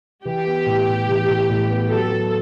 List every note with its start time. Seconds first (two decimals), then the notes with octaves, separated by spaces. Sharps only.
0.25 E3 G4
0.46 B3
0.66 A2
0.87 A2
1.08 E3
1.28 A2
1.49 A2
1.70 B3
1.90 F#3 A4
2.11 F#3